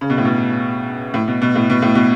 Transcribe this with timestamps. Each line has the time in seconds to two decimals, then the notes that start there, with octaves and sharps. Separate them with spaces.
0.01 C#3
0.10 B2
0.18 A2
0.25 B2
1.14 A2
1.28 B2
1.42 B2
1.56 A2
1.70 B2
1.82 A2
1.95 B2